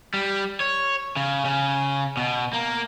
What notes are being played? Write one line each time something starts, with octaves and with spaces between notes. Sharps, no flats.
G3
C#5
C#3
C#3
B2
A#3